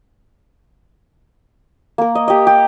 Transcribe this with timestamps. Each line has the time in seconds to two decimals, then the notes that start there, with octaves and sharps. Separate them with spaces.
1.98 A#3 A#4
2.15 D#5
2.28 G4 D#5
2.47 G4